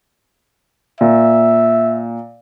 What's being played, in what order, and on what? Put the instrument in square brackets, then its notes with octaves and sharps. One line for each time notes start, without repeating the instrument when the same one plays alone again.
[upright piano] A#2 [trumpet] E5